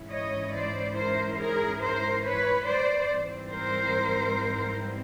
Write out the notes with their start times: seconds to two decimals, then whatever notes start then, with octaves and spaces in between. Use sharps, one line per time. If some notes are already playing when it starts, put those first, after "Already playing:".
Already playing: G#2 E3 G#3 C#4 E4
0.10 C#5 D#5
0.53 C5 D5
0.96 A#4 C5
1.38 G#4 A#4
1.81 A#4 C5
2.23 B4 C#5
2.66 C5 D5
3.08 G#2 E3 G3 C4
3.51 A#4 C5